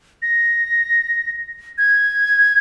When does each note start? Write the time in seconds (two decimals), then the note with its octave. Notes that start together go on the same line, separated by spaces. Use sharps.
0.22 A#6
1.78 G#6